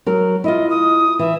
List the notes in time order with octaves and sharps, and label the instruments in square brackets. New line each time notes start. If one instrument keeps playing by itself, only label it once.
[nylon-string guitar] F#3 A#4
[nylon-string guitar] E4 F4 [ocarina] D#5
[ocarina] D#6
[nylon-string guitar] E3 [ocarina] E5